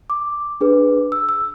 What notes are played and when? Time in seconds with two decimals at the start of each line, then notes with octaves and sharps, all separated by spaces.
0.10 D6
0.61 D4 G#4 B4
1.12 E6
1.29 E6